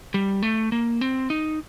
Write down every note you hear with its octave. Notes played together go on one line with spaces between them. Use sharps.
G3
A3
A#3
C4
D#4